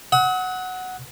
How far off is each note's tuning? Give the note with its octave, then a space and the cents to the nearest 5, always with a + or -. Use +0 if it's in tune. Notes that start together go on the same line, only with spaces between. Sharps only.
F#5 +0 D#6 +45